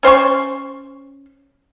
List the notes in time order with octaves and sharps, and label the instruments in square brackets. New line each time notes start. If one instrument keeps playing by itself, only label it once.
[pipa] C#4 C5 G5 C#6